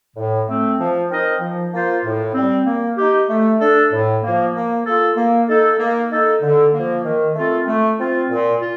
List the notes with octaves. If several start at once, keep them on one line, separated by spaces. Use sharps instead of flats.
A2
A3 C4
F3
C4 D#4 A#4 D#5
F3
A#3 F4 C5
A2
G3 C4
A#3
D#4 G4
A3
D4 A4
A2
F3 A#3
A#3
F4 A4
A#3
D#4 A4
A#3
D#4 A4
D3
F3 A#3
D#3
A3 C4 F4 A4
A3
C4 F4
A#2
F4